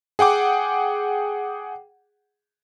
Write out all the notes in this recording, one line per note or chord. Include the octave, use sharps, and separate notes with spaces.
G#4 F#5 G5 D6